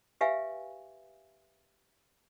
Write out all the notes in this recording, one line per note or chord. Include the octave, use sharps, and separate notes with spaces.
G4 B4 E5 F5 G#5